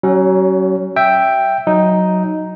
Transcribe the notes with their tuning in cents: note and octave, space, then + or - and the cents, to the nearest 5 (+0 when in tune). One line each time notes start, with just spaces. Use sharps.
F#3 +30 C#4 +0
E5 +0 G5 +0
F#3 +0 D#4 +0